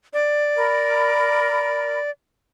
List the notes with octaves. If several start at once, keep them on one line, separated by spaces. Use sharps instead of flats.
D5
A#4 B5